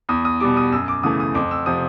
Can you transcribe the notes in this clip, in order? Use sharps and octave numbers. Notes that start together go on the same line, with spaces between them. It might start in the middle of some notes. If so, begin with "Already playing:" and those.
E2 D#6
D#6
B2 G3 D6
D#6
F#2 E6
D6
C#3 E3 A3 D#6
D#6
F2 D6
E6
C3 F3 D#6